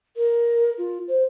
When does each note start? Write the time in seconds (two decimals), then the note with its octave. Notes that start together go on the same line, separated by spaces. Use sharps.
0.16 A#4
0.78 F4
1.08 C5